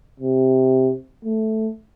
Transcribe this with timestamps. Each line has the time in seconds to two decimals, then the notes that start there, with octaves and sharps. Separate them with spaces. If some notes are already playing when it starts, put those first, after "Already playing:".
0.20 C3
1.25 A3